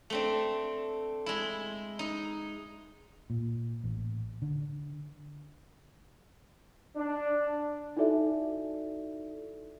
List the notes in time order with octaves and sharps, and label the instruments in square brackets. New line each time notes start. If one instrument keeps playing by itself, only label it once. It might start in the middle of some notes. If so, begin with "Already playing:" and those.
[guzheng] A3 C4 D4
G#3 E4
D#4
[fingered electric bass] A#2
A1
D3
[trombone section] D4
[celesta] D#4 E4 F#4 A4 D5 E5